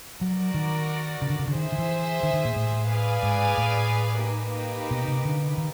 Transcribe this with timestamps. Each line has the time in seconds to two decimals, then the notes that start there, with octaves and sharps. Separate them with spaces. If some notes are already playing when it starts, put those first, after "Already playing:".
0.21 F#3 F#4 A#4 D5
0.54 D#3
1.22 C#3
1.30 D3
1.39 C#3
1.48 D3
1.55 D#3 G#4 C5 E5
1.72 D#3
1.78 E3
2.23 D#3
2.34 D#3
2.45 A#2
2.56 A2
2.90 G#4 B4 D5 F5 G#5
3.23 G#2
3.58 A2
4.24 A#3 D#4 G4 B4
4.91 B2
5.08 C3
5.25 D3
5.58 D#3